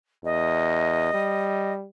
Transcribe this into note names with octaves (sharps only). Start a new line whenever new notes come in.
E2 D#5
G3